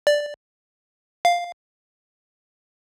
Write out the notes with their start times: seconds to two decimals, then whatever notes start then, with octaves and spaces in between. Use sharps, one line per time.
0.07 D5
1.25 F5